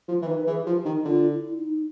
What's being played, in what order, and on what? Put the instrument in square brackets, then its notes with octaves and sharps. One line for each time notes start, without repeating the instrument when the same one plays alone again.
[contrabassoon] F3
E3
[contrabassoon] D#3 [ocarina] B4
[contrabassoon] E3 [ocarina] G#4
[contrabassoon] F3 [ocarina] G4
[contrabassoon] D#3
[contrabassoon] D3 [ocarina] F4
[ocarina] E4
D#4